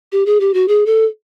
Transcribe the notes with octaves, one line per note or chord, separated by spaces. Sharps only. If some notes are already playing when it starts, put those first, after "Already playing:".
G4
G#4
G4
F#4
G#4
A4